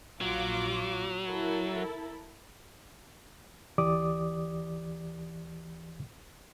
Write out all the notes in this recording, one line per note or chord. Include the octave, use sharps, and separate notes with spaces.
A#1 F#3 F4 D6
E4 A4 A#4
D2 E3 G4 D5 D6 D#6